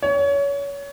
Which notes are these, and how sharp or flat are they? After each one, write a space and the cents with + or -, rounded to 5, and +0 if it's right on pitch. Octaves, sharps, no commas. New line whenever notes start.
C#5 +25